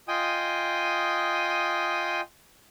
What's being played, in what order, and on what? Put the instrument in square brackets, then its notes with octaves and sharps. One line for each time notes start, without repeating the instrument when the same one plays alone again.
[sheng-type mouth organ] F4 D#5 G5 G#5 D#6